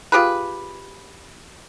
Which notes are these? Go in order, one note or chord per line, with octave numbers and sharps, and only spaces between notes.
F4 G4 G#4 B4